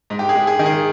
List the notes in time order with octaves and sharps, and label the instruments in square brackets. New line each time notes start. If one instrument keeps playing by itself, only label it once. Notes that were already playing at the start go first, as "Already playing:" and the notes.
[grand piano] G#2
G4
G#4
G#3
G#4
D#3
G#4